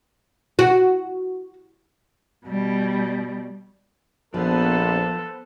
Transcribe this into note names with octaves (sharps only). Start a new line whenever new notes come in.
F#4
B2 G3
A#1 F3 B3 A4 B4 C5